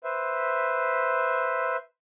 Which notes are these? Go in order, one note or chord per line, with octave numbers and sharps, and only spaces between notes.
B4 C5 E5